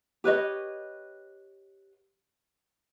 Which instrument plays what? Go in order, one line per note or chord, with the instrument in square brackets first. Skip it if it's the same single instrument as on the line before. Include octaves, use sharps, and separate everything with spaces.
[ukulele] G4 B4 C#5 D#5